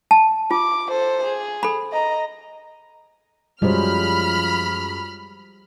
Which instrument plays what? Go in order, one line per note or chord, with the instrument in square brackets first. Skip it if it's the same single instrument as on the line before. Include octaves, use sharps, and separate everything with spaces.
[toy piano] A5
[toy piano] F4 [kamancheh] D6
[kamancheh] A4 C5
G#4
[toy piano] A4 B5
[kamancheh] D#5 A#5
[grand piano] F#2 G#3 [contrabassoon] F3 [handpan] G3 C5 [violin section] B5 F6